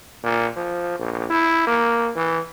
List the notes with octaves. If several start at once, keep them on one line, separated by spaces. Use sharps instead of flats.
A#2
F3
A#1
E4
A#3
E3